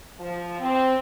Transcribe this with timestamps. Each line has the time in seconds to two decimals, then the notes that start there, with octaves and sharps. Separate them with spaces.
0.19 F3
0.59 C4